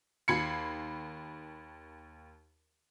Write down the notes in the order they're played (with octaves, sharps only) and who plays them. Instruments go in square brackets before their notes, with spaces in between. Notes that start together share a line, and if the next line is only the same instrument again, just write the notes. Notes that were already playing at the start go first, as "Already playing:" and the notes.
[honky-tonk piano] D#2 B5 G#6 C7 C#7